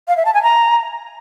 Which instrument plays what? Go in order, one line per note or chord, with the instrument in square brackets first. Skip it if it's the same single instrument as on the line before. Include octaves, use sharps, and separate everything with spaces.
[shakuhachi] F5
E5
A5
G#5
A#5